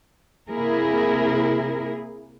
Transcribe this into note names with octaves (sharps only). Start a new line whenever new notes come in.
C3 A#3 E4 G#4 A#4